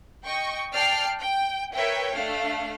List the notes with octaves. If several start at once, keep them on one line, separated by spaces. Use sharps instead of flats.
D#5 G5 C#6
D5 G5 A5 F6 C7
G5
A#4 B4 C#5 E5 G5
A3 D4 F5